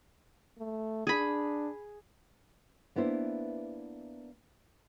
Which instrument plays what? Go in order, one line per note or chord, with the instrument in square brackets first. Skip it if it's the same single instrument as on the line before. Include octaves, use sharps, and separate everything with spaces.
[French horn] A3
[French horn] D4 [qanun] G#4 B5
[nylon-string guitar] A#3 B3 D4 E4 C5